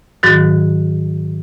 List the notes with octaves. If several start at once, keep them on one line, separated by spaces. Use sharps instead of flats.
G#2 D#3 F#3 F#4